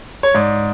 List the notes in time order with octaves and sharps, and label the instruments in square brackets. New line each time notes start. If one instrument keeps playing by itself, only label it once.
[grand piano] C#5
G#2 D5